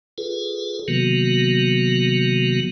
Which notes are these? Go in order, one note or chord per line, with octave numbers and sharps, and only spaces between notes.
F4 G#4 A4 B4
C3 D#3 F#3 A#3 B3 F#4